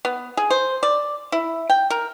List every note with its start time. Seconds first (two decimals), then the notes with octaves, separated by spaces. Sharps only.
0.05 B3
0.37 G#4
0.50 C5
0.83 D5
1.32 E4
1.70 G5
1.90 A#4